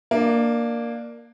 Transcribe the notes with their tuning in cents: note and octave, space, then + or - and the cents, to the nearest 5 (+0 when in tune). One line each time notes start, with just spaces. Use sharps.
A#3 +0 D4 +15